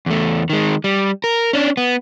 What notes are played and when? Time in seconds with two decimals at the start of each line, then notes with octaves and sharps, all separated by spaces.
0.06 E2 A3
0.50 D#3 G#3
0.84 G3
1.24 A#4
1.53 C#4 D4
1.77 B3